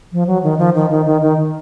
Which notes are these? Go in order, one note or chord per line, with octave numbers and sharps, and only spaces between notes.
F3
F#3
D#3
F3
D#3
D#3
D#3
D#3